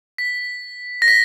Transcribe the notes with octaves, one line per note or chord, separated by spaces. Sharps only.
B6
A#6
B6